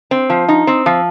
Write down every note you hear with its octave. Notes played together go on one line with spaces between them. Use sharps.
C4
F3
D#4
C4
F3